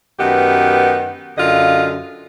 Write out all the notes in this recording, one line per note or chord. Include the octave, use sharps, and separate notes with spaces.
F#2 D#3 B3 G4 B4
F#2 D3 F4 D#5 F5